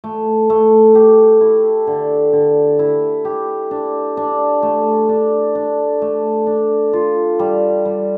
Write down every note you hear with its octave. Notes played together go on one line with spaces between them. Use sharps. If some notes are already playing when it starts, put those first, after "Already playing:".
A3
A3
G4
E4
D3
D3
E4
G4
D4
D4
A3
D4
D4
A3
D4
F4
G3
G3